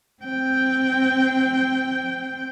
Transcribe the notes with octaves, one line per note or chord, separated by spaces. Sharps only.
C4 G5